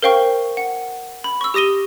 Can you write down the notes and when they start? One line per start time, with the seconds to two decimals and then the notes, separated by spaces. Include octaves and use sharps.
0.03 A#4 C5 F5 G5 C#6
0.57 F#5
1.24 B5
1.41 C#6 E6
1.54 G4 D#6 A#6 D#7 G7